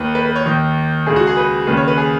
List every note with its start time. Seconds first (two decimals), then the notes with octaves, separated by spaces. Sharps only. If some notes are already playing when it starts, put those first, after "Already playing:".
Already playing: D#2 D#3 B4
0.15 B4
0.25 B4
0.36 C#5
0.46 D#2 D#3
1.06 C#2 C#3 G#4
1.16 F#4
1.27 G#4
1.37 B4
1.67 D#2 C#3 B4
1.77 C#5
1.88 B4
1.97 G#4